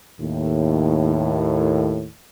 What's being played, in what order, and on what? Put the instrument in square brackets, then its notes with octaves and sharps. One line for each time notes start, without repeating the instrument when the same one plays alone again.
[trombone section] D#2 A2